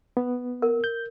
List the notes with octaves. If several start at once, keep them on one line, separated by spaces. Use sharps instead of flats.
B3
A#4
G6